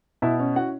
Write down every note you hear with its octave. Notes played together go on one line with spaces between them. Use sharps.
B2 E4 E5
C#4
E4 F#4 F#5